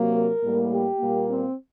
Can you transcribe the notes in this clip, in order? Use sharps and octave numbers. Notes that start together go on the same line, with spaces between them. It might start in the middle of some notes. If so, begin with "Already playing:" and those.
Already playing: C3 F#3 A#3
A#4
A2 G3 A#3
G4
A#2 G3 A#3
C4